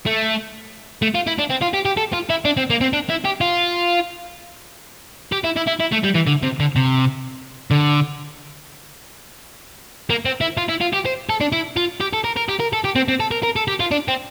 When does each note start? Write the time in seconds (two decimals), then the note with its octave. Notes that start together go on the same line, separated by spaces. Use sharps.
0.06 A3
1.02 A3
1.14 F4
1.27 E4
1.38 D4
1.50 C4
1.61 F4
1.73 G4
1.85 G4
1.97 A4
2.13 F4
2.30 E4
2.45 D4
2.57 C4
2.70 A#3
2.81 C4
2.93 D4
3.10 E4
3.25 G4
3.41 F4
5.32 G4
5.44 E4
5.56 E4
5.67 E4
5.80 E4
5.92 A3
6.04 G3
6.15 E3
6.27 D3
6.43 C3
6.60 D3
6.76 C3
7.71 D3
10.10 A#3
10.25 C4
10.41 E4
10.57 F4
10.69 E4
10.81 F4
10.93 G4
11.05 C5
11.29 A4
11.41 D4
11.52 E4
11.77 F4
12.00 G4
12.13 A4
12.24 A#4
12.36 A#4
12.49 G4
12.60 A#4
12.73 A4
12.84 G4
12.95 C4
13.08 C4
13.20 A4
13.31 A#4
13.43 A#4
13.56 A4
13.68 G4
13.80 F4
13.91 D4
14.08 C4